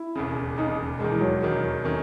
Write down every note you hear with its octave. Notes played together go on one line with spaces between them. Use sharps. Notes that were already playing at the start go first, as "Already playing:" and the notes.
Already playing: E4
E1 D#2 C#3
E1 D#2 C#3 D#4
E1 D#2 D#3 G#3
E3
F#3
E1 D#2 D#3
D#3 A3 C#4